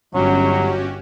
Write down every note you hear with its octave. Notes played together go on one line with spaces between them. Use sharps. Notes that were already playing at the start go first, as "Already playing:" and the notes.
G1 F#3 C#4 F#4 G4